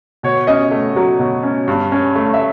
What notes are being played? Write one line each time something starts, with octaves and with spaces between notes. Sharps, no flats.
B2 C#5
C#4 D#5
A3
F#3
B2
C#4
G2
C#4
A3
E5